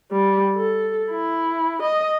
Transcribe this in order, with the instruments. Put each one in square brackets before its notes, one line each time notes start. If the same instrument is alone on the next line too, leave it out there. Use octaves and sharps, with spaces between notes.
[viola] G3
A4
E4
D#5